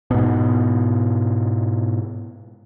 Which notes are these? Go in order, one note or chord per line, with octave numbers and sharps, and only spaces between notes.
G#2 B2